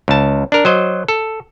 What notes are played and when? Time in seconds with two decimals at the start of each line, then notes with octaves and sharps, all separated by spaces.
0.08 C#2 A5
0.52 D4 A#4
0.65 F#3 C5 D#5
1.08 A4